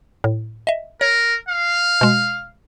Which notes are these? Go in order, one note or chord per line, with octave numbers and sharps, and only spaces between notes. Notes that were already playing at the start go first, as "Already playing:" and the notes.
A2
D#5 E5
A#4 C#5
F5
B2 G#3